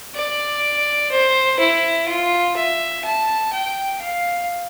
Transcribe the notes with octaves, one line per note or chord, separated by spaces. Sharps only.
D5
C5
E4
F4
E5
A5
G5
F5